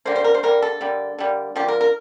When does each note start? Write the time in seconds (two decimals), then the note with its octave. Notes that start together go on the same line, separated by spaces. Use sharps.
0.05 D3 G3 A#3 C5
0.16 C5
0.24 A#4
0.34 C5
0.43 D3 G3 A#3 A#4
0.62 A4
0.81 D3 G3 A#3
1.18 D3 G3 A#3
1.56 D3 F3 A#3 G4
1.68 A#4
1.81 A#4